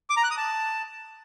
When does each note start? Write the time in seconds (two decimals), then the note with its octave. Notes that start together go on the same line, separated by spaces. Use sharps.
0.10 D6
0.17 A#5
0.24 F#6
0.31 D#6
0.38 A5